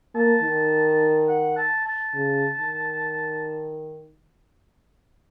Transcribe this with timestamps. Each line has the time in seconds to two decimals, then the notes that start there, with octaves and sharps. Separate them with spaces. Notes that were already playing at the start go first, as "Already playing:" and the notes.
0.15 A#3 A5
0.43 D#3
1.28 F#5
1.57 A5
1.86 A5
2.14 C#3
2.58 D#3